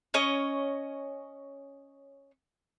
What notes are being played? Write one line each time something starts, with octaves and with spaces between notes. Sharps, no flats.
C#4 C#5 D#5